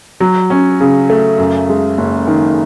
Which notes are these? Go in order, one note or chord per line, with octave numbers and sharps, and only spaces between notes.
F#3
C#4
C#3
A3
F#2
G#3
F#1
D#3